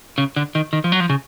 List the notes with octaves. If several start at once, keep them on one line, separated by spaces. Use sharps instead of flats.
C#3
D3
D#3
D#3
F3
F#3
F3
C#3